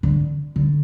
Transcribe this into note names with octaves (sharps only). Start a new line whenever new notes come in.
D3
D3